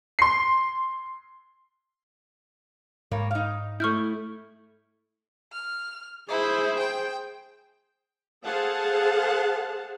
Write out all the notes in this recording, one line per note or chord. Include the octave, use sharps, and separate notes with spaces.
C6 C7
G#2 G3 A#3 C#5
D#4 F5
A3 E4 C#6 F6 G6
F6
E4 G#4 C5
G5
G#4 A4 C5 F5 F#5 A5